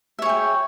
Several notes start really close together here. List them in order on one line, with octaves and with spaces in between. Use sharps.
E5 C#5 G#4 G5